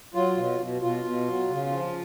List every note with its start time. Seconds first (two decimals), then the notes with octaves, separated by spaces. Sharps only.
0.14 F#3 F4
0.37 B2
0.60 B2
0.82 B2 F4
1.04 B2
1.28 F#3
1.50 C#3
1.72 F3